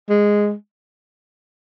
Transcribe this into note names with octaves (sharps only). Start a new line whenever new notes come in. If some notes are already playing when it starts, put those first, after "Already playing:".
G#3